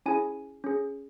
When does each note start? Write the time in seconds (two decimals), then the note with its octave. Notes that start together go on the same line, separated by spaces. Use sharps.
0.06 C#4 E4 G#4 G#5
0.64 C#4 G#4